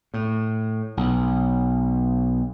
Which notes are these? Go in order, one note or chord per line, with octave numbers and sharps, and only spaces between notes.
A2
B1